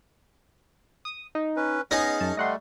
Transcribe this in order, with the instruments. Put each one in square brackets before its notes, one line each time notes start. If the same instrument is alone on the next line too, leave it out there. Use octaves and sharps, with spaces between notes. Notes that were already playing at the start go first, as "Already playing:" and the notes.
[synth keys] D#6
D#4
[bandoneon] C#4 B4
[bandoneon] B3 [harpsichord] C#4 D#4 G#4 [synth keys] D#5 A#6
[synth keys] F#2 A5
[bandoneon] G3 A3 [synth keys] D#5 F#5 C6